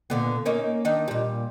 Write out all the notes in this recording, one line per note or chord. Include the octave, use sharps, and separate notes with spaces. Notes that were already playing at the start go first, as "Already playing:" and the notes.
A#2 D3 B3
A#3 C#4 D#4
D#3 D4 D#4
A#2 G3